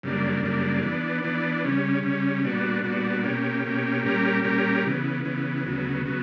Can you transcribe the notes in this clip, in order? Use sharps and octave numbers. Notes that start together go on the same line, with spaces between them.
F#2 C#3 G3 A#3 D4
F#2 C#3 G3 A#3 D4
E3 B3 D4
E3 B3 D4
C#3 G3 C#4
C#3 G3 C#4
A#2 G3 B3 D4 F#4
A#2 G3 B3 D4 F#4
B2 A#3 C#4 G4
B2 A#3 C#4 G4
A#2 G3 C#4 G4 A#4
A#2 G3 C#4 G4 A#4
C#3 E3 B3
C#3 E3 B3
D2 C#3 F#3 B3
C#3 F#3 B3